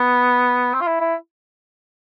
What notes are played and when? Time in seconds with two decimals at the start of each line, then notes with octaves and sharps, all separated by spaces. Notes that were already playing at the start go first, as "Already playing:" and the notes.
Already playing: B3
0.74 C4
0.81 F4
0.87 E4
1.01 E4